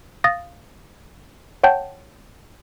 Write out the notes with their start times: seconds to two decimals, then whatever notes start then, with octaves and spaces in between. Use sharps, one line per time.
0.24 F5 D#6 A6 A#6
1.64 C#5 F#5 G5 A5 G6